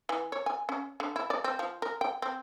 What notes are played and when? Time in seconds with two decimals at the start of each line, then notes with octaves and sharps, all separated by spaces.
0.09 E3
0.32 C#5
0.46 G#5
0.69 C#4
1.00 D3
1.16 E4
1.30 D5
1.44 C4
1.59 F3
1.82 A#4
2.01 G5
2.22 C4